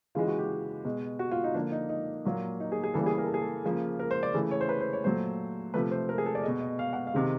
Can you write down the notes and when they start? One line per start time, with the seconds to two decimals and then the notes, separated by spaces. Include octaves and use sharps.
0.15 C#3 E3 G#3 F4
0.27 F#4
0.38 G4
0.85 B2 G#3
1.19 F#4
1.31 F4
1.44 D#4
1.54 D3 F3 A#3 D4
1.72 D#4
1.89 D#4
2.25 A#2 F#3 A#3
2.60 D#4
2.72 G#4
2.84 G#4
2.94 C#3 E3 G3 A#3 A4
3.06 G#4
3.18 A#4
3.26 A4
3.34 G#4
3.42 A4
3.64 C#3 F3 A#3
3.99 A#4
4.11 C5
4.23 D5
4.34 C#3 E3 A3
4.51 C#5
4.61 C5
4.69 B4
4.81 C5
4.93 C#5
5.04 A#2 F#3 A3 C5
5.74 C3 F3 A3 B4
5.91 C5
6.09 A#4
6.18 G#4
6.26 A4
6.35 D5
6.44 B2 G#3 D#5
6.61 D#5
6.79 F5
6.93 F#5
7.07 F5
7.14 C3 D#3 G#3